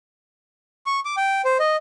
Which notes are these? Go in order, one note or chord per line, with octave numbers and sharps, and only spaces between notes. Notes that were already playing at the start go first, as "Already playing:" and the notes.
C#6
D6
G5
C5
D#5